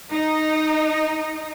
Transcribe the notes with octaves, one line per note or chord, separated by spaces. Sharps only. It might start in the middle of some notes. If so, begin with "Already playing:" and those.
D#4